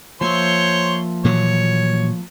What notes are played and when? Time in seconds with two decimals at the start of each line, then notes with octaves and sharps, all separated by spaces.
0.21 F3 A#3 C5 C#5 E5 C6
1.25 A#2 E3 F#3 C#5